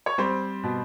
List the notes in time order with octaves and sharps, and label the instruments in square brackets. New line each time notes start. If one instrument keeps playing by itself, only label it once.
[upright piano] C#5
[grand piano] G3 [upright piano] C4 C5
[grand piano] B2